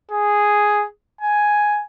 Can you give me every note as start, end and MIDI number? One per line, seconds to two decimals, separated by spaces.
0.11 0.85 68
1.21 1.83 80